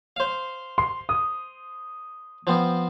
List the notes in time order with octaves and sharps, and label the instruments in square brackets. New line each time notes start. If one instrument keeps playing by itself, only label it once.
[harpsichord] C5 F5
[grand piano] C6
D#6
[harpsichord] F3 B3 C4